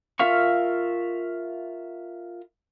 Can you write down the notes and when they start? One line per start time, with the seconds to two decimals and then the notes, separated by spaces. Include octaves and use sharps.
0.19 F4 A#4 E5 F5 C#6